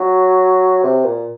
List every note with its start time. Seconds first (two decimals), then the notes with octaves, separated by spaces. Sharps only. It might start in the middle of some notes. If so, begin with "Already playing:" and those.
Already playing: F#3
0.84 C3
1.04 A#2